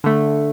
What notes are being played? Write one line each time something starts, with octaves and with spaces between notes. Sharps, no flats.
D3 A3